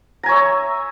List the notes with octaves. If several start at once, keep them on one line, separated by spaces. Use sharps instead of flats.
C#5 E5 G#5 A#5